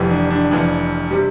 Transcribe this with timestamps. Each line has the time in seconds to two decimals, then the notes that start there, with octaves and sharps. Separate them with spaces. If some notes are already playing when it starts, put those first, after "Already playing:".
Already playing: F1 F2 E3 G3
0.11 D4
0.31 D4
0.51 F1 F2 E3 D4
1.11 C3 G3